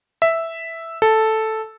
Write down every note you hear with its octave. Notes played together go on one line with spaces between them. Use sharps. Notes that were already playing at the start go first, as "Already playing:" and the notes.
E5
A4